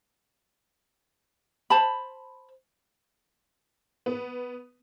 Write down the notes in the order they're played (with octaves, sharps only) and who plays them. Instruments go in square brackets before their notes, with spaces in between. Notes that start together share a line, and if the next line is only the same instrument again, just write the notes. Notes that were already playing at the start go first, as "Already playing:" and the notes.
[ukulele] C5 A5 B5
[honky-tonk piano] B3